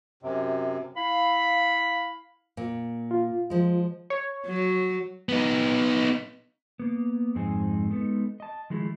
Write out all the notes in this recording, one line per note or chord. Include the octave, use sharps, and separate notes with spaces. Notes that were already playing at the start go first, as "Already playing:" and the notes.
F#2 C3
E4 F5 B5
A#2
F4
F3 G#3
C#5
F#3
B3 D#4
A#3 B3
F2 G#2 G#3 C4 D#4 G#5
G#3 B3 D#4 A4
D#5 A5
D#3 F3 G#3 A3 E4